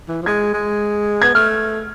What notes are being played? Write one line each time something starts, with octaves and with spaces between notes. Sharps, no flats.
E3
F3
G#3 G#6
G#3
B3 G#6
A3 F6